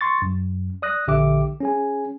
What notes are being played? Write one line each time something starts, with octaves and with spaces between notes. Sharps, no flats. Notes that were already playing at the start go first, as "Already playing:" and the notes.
C6 C#6 A6
F#2
D5 D#6 F#6 A#6
A#1 D3 G4 E5 D6
C#4 G#4 G#5